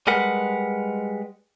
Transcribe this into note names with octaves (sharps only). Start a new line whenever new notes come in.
G3 G#3 A#4 B4 F#5